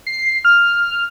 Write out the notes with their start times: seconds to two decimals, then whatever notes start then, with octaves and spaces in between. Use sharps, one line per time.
0.07 C7
0.45 F6